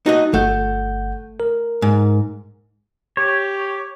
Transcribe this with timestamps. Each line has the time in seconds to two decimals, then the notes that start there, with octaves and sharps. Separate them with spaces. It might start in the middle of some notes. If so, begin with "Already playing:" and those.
0.06 D#4 F#4 D#5
0.34 G1 A3 F#5 G6
1.40 A#4
1.82 G#2
3.17 G4 C#5